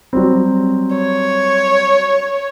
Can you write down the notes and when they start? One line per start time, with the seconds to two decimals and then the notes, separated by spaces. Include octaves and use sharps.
0.13 F#3 G3 C4
0.96 C#5